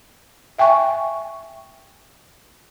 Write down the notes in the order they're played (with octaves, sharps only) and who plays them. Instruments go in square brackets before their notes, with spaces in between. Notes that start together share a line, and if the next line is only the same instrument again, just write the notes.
[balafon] E5 G5 G#5 C#6